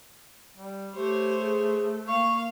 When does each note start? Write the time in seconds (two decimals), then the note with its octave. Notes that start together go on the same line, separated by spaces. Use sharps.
0.57 G3
0.94 A3 G4 C5 C#5
1.41 G#4
2.08 A#3 F5 C#6